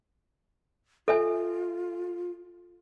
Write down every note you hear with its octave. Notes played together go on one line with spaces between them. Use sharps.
F4 A4 E5 G#5